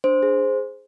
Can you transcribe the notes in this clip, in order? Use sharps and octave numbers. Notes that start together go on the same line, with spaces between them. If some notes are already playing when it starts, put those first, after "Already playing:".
D4 C5
G#4